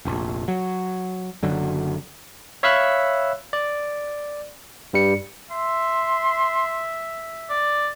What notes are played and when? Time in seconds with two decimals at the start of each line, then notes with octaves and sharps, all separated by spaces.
0.05 F1 A#1
0.48 F#3
1.43 F#1 D3 F#3
2.63 C#5 E5 F5 B5 E6 F#6
3.53 D5
4.93 G2 G3 C#7
5.51 E5 C6
7.50 D5